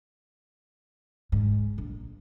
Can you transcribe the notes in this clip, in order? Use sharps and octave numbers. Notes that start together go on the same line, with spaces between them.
G#2
A#1